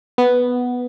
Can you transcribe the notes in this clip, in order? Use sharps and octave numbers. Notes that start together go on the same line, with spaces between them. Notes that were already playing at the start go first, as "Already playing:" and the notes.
B3